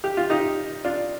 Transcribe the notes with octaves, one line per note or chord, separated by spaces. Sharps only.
G4
F4
D#4 G4
D4 F4